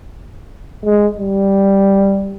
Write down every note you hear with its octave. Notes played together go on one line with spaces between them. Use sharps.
G#3
G3